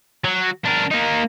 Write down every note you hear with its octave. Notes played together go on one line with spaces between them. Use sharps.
F#3
D4 A#4
A#3 D#4